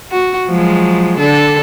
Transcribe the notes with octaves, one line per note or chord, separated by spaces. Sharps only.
F#4
F3 F#3 G#3
D3 D4 A4